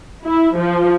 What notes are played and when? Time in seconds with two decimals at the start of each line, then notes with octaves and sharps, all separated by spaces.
0.24 E4
0.56 F3